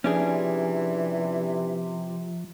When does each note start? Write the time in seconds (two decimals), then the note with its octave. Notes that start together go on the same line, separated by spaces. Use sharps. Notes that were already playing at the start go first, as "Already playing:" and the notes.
0.04 C3 E3 F3 C#4 D4 G#4